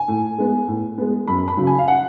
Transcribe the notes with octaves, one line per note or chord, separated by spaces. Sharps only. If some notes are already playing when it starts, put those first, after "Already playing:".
Already playing: G#5
A2
G#3 B3
A2
G#3 B3
F#2 B5
B5
C#3 F#3
G#5
F5
F#5